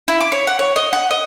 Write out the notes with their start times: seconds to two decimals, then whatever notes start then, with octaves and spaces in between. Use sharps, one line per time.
0.08 E4
0.20 D6
0.32 C#5
0.47 F#5
0.59 C#5
0.76 D#5
0.93 F#5
1.11 D#5